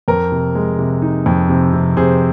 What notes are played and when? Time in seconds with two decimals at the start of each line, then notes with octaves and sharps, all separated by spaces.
0.08 F2 A#4
0.32 C3
0.55 G#3
0.79 C3
1.02 D#4
1.26 F2
1.49 C3
1.73 C3
1.97 C3 G#4 C5